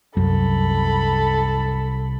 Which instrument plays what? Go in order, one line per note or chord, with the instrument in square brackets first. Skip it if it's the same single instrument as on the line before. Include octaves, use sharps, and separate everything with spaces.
[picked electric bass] C2 [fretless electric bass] F#2 [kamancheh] A4 B5